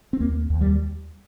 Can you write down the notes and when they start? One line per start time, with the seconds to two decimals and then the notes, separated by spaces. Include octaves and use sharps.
0.13 C4
0.20 D#2 A#3
0.50 D#2
0.61 G3